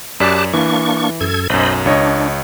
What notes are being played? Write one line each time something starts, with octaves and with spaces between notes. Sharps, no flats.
F#2 G4 D5 A5 F#6 B6
E3 A#3 D4 C#6
F#2 A4 G#6
B1 F#2 C5 D#5 B5
C#2 D4 C#5 D#5